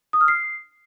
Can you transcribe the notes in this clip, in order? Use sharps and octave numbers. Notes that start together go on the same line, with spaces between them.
D#6
F6
C7